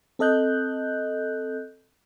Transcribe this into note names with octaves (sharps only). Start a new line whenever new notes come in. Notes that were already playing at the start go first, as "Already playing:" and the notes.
C4 A4 D#5 F#6 G6